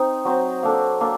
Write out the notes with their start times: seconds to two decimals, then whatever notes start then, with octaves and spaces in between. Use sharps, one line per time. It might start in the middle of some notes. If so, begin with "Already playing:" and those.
Already playing: C4 D#4
0.25 F#3 C4 D#4
0.63 A#3 D4 A4
1.01 A#3 D4 A4